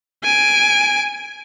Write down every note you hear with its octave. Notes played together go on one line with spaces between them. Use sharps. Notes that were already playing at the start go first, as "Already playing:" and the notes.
G#5 D7